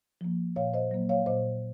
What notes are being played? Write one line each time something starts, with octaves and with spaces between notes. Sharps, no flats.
F3 A#3
A#2 C#5 F5
C5 D#5
F#3 A#3
C#5 F5
A#2 C5 D#5